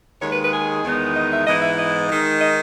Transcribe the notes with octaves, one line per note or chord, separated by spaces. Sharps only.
D#2 D#3 G#3 D#4 C#5
B4
B4
G#4
E2 D#3 G#3 B3 D#4
D#5
E5
G#2 E3 B3 E4 D#5
E5
D#5
D#3 G#3 D#4
D#5